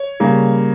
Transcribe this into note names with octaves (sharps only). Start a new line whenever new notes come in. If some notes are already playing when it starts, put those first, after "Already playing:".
Already playing: C#5
C#3 G3 A#3